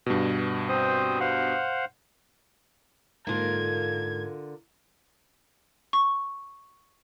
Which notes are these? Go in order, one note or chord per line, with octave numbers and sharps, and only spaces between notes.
G2 B2
C4 C5 D#6
C5 F5 F#5
G#2 D3 A#3 F4 A#4 G#6
C#6